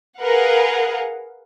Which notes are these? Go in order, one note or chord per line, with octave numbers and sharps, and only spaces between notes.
G#4 A#4 B4 F5 F#5